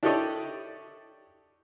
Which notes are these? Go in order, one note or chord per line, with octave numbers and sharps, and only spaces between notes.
D4 E4 G4 A4 C#5 D#5